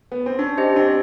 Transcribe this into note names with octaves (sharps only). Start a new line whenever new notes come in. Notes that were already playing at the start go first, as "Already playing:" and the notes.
B3
C4
C#4 D4
G4 C5 D#5
C4 D4